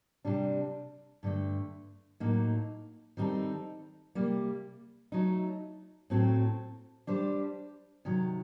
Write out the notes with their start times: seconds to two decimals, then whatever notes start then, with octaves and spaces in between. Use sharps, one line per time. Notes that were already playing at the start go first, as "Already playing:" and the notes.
0.25 C3 G3 D4
1.23 G2 D3 A3
2.20 A2 F#3 A#3 D#4
3.17 D#3 G3 C4 D#4 A4
4.15 C3 G3 A#3
5.12 F#3 A3 D#4
6.10 A2 F#3 C4 F#4 A4
7.07 G3 D4 G4 C5
8.05 C3 D#3 F#3